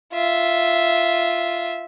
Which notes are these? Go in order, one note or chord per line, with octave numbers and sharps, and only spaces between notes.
F4 E5